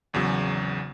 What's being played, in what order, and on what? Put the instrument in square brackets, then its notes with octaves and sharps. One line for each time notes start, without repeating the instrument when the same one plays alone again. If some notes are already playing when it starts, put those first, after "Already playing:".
[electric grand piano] G#1 E2 C#3 F#3